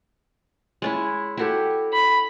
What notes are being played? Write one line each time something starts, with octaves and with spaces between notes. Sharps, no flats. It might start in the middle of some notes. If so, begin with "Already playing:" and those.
G#3 C#4 E4
E4 F#4 G4 A4 G5
B5